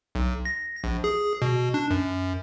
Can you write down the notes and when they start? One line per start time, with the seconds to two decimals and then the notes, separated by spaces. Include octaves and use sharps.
0.15 B1
0.45 A#6
0.84 A#1
1.04 G#4
1.42 B2
1.74 D4
1.91 F#2